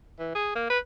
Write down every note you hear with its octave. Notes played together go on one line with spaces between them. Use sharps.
E3
G#4
A#3
B4